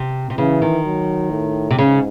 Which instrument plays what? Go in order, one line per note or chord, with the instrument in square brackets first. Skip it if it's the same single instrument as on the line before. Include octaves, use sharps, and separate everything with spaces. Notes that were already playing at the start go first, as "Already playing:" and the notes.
Already playing: [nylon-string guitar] C3
C3
[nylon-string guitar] C#3 [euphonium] E3
[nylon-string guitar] D#3
[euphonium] F#3
A2
[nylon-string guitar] C3
[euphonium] G#2 [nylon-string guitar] C#3